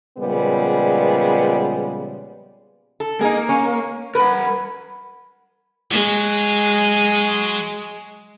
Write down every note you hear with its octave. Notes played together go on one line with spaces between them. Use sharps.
A#2 C#3 F3 G3 G#3 B3
A4
A#3 D#4 G#4
C#4
A#4 B4 F#5
F#3 G#3